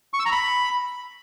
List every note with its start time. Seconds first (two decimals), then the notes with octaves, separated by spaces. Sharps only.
0.14 C#6
0.20 E6
0.26 A#5
0.32 B5